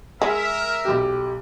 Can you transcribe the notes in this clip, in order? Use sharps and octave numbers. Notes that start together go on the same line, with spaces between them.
G#3 A#4 E5
B1 G4